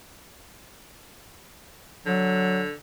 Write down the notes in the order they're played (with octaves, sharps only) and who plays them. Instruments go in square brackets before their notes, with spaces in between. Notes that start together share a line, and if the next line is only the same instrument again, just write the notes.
[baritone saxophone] D3 [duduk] F#3